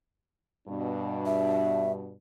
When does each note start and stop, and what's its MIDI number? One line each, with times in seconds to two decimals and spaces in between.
0.68 2.13 43
0.68 2.13 47
0.68 2.13 62
1.26 1.92 76